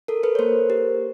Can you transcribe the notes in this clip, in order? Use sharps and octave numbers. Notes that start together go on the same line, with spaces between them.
A4 A#4
A4 B4
C#5
A#3 A#4 C5
G4